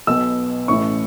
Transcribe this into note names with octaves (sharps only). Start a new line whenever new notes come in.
B1 B2 B3 E6
A1 A2 E3 A3 C#4 C#6